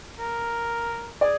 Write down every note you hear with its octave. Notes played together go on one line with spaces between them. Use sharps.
A#4
G#4 D5